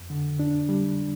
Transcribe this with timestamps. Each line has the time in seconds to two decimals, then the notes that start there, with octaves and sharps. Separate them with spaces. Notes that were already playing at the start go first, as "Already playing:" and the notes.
Already playing: F2
0.10 D3
0.39 D4
0.69 G3